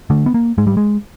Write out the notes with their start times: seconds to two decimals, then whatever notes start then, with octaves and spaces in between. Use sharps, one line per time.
0.10 D3 A3
0.26 B3
0.34 A#3
0.58 G#2 G#3
0.67 G3
0.77 G#3